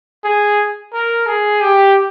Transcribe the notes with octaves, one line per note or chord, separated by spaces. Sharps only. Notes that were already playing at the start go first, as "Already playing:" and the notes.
G#4
A#4
G#4
G4